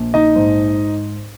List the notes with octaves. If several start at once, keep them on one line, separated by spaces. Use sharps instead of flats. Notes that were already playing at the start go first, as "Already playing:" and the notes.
Already playing: A#1
D#4 D#5
G#2